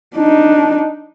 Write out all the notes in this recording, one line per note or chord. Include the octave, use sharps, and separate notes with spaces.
D4 D#4